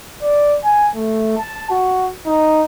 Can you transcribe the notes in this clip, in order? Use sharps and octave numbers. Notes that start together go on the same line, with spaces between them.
D5
G#5
A3
A5
F#4
D#4